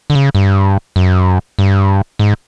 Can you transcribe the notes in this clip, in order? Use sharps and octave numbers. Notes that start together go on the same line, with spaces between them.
D3
C#3
G2
F#2
G2
G#2